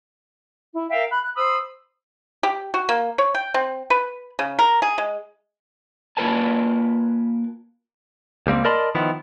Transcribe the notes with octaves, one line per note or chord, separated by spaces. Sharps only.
E4
A#4 E5 F5 G5
B5 F#6
F#6
C5 B5 D#6 E6
G4
F#4
A#3
C#5
G5
C4
B4
C#3
A#4
G#4
G#3
A#3 F4 A#4 B4 G#5 A5
C#2 G3 A#3 C4
A#4 D5 D#5 A5 B5 C6
D#3 F3 B3 E4